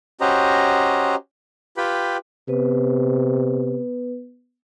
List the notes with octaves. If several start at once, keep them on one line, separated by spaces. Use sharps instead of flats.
C#4 F#4 G4 C5 D#5 A#5
F4 G4 B4 G5 B5
C3 B3 B4